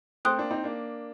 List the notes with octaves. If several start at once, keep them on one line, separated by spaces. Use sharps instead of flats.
A3 C4 C5 G5 C6 D#6 F#6
A#3 D4
C4 D#4
A#3 D4